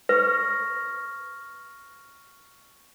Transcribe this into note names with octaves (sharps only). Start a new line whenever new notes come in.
B4 C#6 F6 A#6